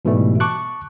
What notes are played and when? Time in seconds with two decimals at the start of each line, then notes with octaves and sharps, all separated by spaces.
0.05 G#2 B2 E3 G3 A3
0.40 A5 C#6 D6 F#6